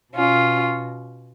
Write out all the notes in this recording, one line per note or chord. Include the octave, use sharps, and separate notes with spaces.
B2 C#4 F4